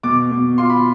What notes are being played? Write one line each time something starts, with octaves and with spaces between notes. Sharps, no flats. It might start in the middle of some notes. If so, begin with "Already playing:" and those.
B2 D6
B2
F4 C6
B5